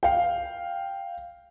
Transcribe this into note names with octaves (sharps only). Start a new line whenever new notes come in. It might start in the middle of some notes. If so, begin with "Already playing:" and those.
F5 G5